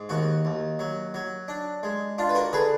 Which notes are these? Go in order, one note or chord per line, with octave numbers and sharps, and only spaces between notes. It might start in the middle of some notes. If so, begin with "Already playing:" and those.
Already playing: G#2
D#2 F#4
D#2
F#3
F#3
D4
G#3
D4 F4
B4
F#4 A#4
D3 G#4 B4